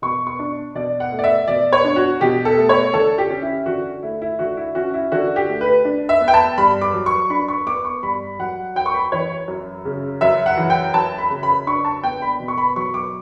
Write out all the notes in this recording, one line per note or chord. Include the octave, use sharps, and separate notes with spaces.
B2 C#6
C#6
D4
B2 D5
F#5
A3
D5
E5
B2 D5
C#5
D4
F#4
B2 G4
A4
A3
C#5
D3 A4
G4
C#4
E4
D3 F#4
A3 E4
E4
D3 F#4
E4
C#4 F#4
E4
D3 F#4
G4
A3
B4
D4
E5
B3
G5
A5
G2 B5
D6
F#3
C#6
D4 B5
C#6
B3 D6
C#6
G2 B5
F#3 F#5
F#2 G5
C#6
B5
E3 C#5
F#2
C#3
F#2 E5
F#5
E3
G5
F#2 A5
B5
C#3
B5
D4 C#6
A5
B3 G5
B5
B2
C#6
B5
F#3 C#6
D6